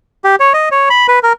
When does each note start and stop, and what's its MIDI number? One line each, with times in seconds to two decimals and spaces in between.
0.24 0.36 67
0.40 0.53 73
0.54 0.69 75
0.71 0.89 73
0.90 1.07 83
1.08 1.19 71
1.23 1.33 70